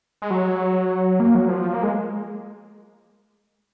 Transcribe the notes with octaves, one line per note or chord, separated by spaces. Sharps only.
G#3
F#3
A#3
F#3
F3
A#3
G#3